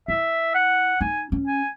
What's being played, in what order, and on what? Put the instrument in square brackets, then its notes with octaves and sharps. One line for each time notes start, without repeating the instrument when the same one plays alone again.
[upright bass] E4 [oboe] E5
[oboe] F#5
[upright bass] D#4 [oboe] G#5
[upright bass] C#4
[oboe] G#5